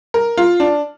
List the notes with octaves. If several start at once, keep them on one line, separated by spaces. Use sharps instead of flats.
A#4
F4
D4